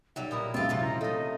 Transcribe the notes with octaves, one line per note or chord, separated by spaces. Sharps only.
B1 F#3 G3 E5
A#2 E4 A#4 D#6
C#2 F#2 C4 F4 A6
C3 F3 C#4
E3 A#5 C6
A3 D#4 D#5